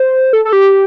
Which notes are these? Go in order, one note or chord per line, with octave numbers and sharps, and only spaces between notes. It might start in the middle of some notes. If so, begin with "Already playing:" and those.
Already playing: C5
A4
A4
G4